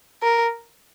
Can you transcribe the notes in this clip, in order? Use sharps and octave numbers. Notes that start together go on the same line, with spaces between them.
A#4